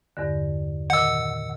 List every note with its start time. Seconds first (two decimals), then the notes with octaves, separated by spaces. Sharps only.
0.17 E2 G2 D3
0.90 A#2 D#3 F#5 E6